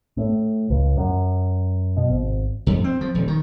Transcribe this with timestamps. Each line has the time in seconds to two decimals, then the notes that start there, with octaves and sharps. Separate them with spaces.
0.17 A2
0.70 C#2
0.97 F#2
1.97 B2
2.10 G#1
2.66 F2
2.84 C4
3.01 F3
3.15 D#1
3.28 D#3